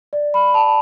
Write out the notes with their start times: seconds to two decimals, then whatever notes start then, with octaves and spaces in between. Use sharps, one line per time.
0.13 D5
0.34 B5
0.54 A5